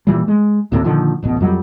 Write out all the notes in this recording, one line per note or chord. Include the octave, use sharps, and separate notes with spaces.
A#2 E3 G3
G#3
D2 A2 C3 A#3
A#2 D3 D#3 F3
D1 A1 B2
F2 F#3 G3